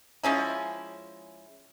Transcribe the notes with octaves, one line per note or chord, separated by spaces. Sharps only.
F3 G#3 C#4 E4